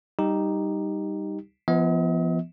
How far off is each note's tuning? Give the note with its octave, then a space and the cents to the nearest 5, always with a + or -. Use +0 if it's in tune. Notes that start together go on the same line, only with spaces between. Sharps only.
G3 +0 D#4 +0 G4 +0
F3 -40 B3 +0 D#5 +45